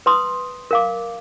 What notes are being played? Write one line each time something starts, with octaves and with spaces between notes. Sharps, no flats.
B4 C6 D#6
A#4 F5 D6